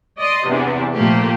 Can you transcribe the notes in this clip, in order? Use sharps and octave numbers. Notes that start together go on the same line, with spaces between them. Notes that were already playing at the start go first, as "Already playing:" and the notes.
D5 D#5 C6
E2 C3 D4
A#2 F3 A3 A#3 G4